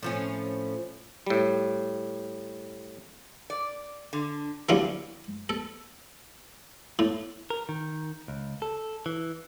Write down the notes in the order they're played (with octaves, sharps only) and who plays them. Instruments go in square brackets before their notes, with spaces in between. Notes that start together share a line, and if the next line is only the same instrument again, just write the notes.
[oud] A2 F3 C#4
[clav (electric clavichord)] A2 G3
[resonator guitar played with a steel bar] D5
D3
[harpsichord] D3 E3 F#3 G3 A#3 C#4
A4
A2
[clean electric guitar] A#4
D#3
C#2
A4
E3